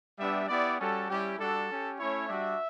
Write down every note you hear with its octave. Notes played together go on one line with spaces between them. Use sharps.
G3 B3 D4 G4 E5
B3 E4 G4 D5
G3 C#4 F#4 A4
G3 C#4 E4 G4
G3 D4 F#4 A4
C#4 G4
A3 C#4 E4 C#5
G3 D4 F#4 E5